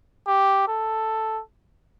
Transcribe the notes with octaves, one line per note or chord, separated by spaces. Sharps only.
G4
A4